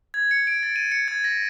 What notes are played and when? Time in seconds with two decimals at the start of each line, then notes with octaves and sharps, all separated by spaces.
0.14 G#6
0.31 C#7
0.47 D7
0.63 A6
0.76 D#7
0.92 C#7
1.08 G#6
1.24 A#6